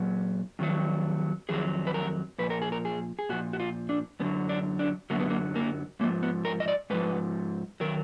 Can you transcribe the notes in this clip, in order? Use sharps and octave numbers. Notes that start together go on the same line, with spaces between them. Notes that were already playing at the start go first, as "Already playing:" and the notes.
Already playing: A#2 F#3
F2 D#3 F#3
F2 D#3 F#3 G#4
B4
A#4
A#2 F3 B4
A#4
G#4
A#4
G#4
G#4
A#2 F3 F#4
F#4
F4
D4
F#2 D3 F#3 B3
D4
D4
F#2 D3 F#3 A#3
B3
A#3
A#3
G#2 F3 A#3
B3
A#4
D#5
D5
G#2 F3 B4
D#3 F#3 A#4